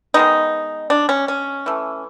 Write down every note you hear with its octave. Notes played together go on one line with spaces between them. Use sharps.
D#3 G#3 B3 D#4
D4
C#4
C#4
E3 A3